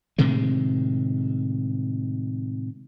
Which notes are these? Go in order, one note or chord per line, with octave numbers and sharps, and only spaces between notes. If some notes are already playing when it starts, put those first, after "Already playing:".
A2 C3 D#3 G#3